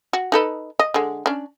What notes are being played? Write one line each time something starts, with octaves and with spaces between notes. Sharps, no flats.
F#4
D#4 A4 B4
D#5
D3 G#3
C#4 D4